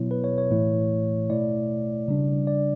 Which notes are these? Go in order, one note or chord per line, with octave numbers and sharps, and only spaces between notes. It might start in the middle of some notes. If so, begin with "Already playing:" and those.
Already playing: B2 F#3 B3 E4 C#5
B4
C#5
C#5
A2 E3 A3 E4
B2 A3 E4 D5
C#3 G3 D4
D5